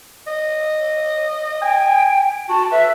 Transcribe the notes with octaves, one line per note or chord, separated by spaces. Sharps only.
D#5
G5 G#5
F#4 A5
B4 E5